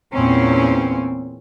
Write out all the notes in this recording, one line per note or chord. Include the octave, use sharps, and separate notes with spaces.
E2 A#2 C4 C#4